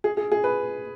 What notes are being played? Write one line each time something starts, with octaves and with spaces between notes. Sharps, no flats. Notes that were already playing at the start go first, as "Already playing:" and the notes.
G#4
G#4
G#4
B4